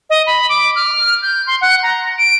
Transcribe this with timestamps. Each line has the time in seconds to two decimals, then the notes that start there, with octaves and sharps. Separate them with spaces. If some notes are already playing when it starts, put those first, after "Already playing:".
0.10 D#5
0.26 B5
0.49 D6
0.76 F6
1.22 G6
1.47 C6
1.61 F#5
1.83 A#5
2.18 D7